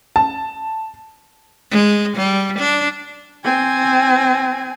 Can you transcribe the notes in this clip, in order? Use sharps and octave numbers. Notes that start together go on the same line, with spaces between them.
A5
G#3
G3
D4
C4 G#5